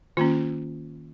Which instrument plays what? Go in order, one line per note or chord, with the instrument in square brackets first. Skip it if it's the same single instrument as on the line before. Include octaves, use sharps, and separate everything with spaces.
[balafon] D#3 A#3 C#4 F4